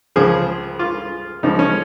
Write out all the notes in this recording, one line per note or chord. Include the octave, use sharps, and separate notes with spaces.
C#2 C#3 F3 G#4
F4
C#2 C#3 F3 D#4
C#4